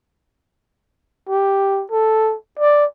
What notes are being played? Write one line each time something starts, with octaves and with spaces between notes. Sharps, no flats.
G4
A4
D5